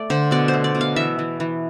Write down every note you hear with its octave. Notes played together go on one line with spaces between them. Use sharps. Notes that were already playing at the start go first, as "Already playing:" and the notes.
Already playing: A3 D5
D3 C5
B2 D5
C5
A3
D5
B2
F5
E3 E5
E3
E3